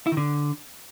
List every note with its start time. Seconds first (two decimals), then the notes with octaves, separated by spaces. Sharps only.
0.07 E4
0.12 D#3
0.17 D3